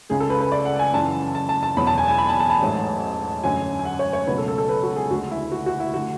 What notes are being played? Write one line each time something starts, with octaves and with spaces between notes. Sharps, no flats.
C#2 C#3 G#3 G#4
A4
B4
B4
D5
F#5
G#5
F#2 C#3 E3 A5
A5
A5
A5
E2 B2 F#3 B5
A5
G#5
G#5
B5
A5
A5
A5
A1 G#2 F#3 A3
F#2 D3 F#3 A3 G#5
G#5
F#5
C#5
C#5
C#2 B2 F#3 A3 B4
A4
A4
A4
B4
F#4
G#4
D2 D3 G#3 F#4
E4
F#4
F#4
E4
D3 A3 F#4